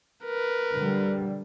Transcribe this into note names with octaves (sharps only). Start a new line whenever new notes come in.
A#4 B4
D3 G3